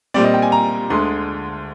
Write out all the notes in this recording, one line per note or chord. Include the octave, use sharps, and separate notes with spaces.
A#2 G3 C4 D5
D#5
G5
G#5
A#5
D2 D3 G#3 C6